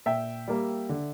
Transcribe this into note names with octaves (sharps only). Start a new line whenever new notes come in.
A#2 E5 G5
G3 A#3
D3